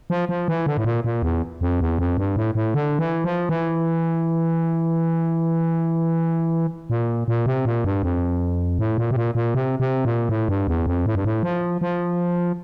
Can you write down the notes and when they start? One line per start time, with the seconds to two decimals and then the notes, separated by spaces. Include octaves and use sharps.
0.10 F3
0.29 F3
0.48 E3
0.66 D3
0.77 A2
0.85 A#2
1.04 A#2
1.23 E2
1.61 F2
1.80 E2
1.98 F2
2.18 G2
2.36 A2
2.55 A2
2.74 D3
2.99 E3
3.24 F3
3.49 E3
6.90 A#2
7.28 A#2
7.46 C3
7.65 A#2
7.85 G2
8.03 F2
8.79 A2
8.98 A#2
9.11 C3
9.16 A#2
9.35 A#2
9.54 C3
9.80 C3
10.05 A#2
10.29 A2
10.49 G2
10.68 E2
10.86 F2
11.06 A2
11.15 G2
11.25 A2
11.43 F3
11.81 F3